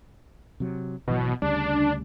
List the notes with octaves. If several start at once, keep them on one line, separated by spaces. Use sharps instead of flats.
C3 F#3
G#1 B2 E3 F#3
D2 C#3 G3 D4